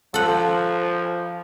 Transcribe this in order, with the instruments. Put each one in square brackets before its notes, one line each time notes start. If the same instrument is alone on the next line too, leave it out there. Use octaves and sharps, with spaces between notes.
[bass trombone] F3 [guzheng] A4 F#5